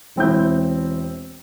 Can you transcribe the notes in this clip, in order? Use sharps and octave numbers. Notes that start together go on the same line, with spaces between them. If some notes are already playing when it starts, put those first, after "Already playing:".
E1 C4 E4 G6